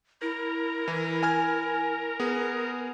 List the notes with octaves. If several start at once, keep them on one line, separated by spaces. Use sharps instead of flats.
E4 A#4
E3
G#5 F6 G#6
B3 G#4